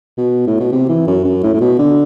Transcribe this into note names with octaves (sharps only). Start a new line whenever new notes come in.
B2
A2
B2
C3
E3
F#2
F#2
A2
A2
B2
D3